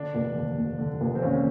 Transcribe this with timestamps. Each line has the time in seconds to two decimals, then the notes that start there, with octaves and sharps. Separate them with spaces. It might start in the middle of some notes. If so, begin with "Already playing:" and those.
Already playing: D3 D4
0.15 F1
0.36 D#2
0.58 F1
0.79 D3
1.01 F1
1.15 C4
1.22 D#2 C#4